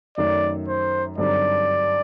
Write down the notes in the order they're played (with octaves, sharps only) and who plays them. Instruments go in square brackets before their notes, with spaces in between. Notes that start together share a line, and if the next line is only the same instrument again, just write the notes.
[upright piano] F#2 D#3 A3 [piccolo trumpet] D5
[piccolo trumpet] C5
[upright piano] G2 D3 F#3 C4 D#4 [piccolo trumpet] D5